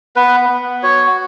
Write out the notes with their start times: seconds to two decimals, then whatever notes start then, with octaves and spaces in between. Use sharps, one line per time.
0.16 B3 B4
0.49 B3
0.83 F#4 C#5